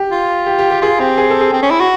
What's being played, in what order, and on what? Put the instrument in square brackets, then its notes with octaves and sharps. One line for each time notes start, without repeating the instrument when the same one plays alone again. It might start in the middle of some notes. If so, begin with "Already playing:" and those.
Already playing: [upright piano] G4
[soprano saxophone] F4
[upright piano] G4
G4
G4
[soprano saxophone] F4 [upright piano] G#4
[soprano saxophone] C4 [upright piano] G4
[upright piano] G#4
A4
G#4
[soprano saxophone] C4
C#4
E4
F#4